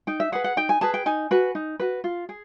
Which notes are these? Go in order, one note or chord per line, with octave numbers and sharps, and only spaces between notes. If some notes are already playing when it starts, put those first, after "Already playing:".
D#4 G5
E5
G#4 B4 F#5
F#5
D#4 G5
G#5
G#4 B4 A5
G5
D#4 G#5
F#4 B4
D#4
F#4 B4
F4
G#4